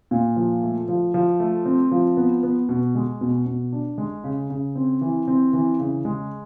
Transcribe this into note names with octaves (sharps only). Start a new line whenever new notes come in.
A#2
F3
A3
F3
F3
A3
C4
F3
B3
B3
B2
G#3
B2
B2
D4
G#3
C#3
C#3
C4
E3
C4
E3
C#3
G#3